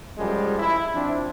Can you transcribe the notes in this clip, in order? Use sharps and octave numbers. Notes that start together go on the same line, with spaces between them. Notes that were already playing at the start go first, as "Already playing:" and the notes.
F#2 F3 G3 G#3
E4
F3 C4 D4 E4